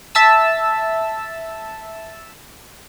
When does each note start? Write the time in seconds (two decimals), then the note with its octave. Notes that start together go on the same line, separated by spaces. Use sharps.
0.15 E5 A5 E6